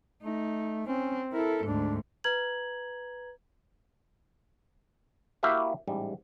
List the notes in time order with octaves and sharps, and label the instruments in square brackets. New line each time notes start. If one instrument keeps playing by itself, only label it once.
[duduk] A3 [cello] D#4
[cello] C4 [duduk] C#4
[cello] E4 A4 [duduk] A#4
[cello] D2 G#2 [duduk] D4
[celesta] B4 A#5 G#6 F#7
[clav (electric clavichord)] A#3 E4 F#4 G4 E5 F5
A1 G#2 G3